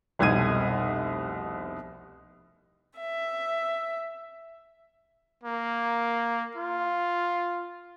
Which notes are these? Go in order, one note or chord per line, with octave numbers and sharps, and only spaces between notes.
F1 C2 B2 G#6 D#7
E5
A#3
F4